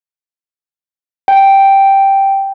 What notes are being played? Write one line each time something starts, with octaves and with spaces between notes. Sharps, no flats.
G5